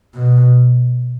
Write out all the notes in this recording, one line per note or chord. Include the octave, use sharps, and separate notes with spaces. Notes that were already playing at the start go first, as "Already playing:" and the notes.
B2